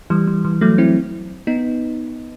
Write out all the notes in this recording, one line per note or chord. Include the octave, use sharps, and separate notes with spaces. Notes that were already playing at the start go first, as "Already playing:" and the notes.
E3 G3
E3
E3
F#3 A3
C4 E4
B3 D#4